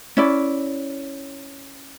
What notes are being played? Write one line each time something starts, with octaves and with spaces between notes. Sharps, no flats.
C#4 E4 D5